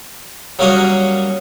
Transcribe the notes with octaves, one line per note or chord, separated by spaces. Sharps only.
F#3 G3 A#3 C#4 F#4 G#4